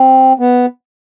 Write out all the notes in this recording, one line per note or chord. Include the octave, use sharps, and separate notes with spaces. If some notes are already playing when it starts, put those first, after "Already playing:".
Already playing: C4
B3